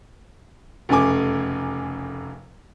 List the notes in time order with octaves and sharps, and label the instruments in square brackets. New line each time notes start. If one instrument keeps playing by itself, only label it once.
[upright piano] F1 F#2 C#3 A3 G#5 D6